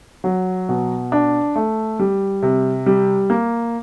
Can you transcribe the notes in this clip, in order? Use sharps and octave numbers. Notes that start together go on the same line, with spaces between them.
F#3
B2
D4
A3
G3
C3
G3
A#3